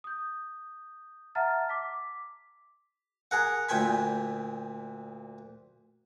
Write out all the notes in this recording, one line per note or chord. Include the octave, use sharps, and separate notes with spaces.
D#6 G6
E5 F#5 A5 A#5 F6 A6
D6 B6
G#4 A#4 F#5
D2 A#2 G5 G#5 B5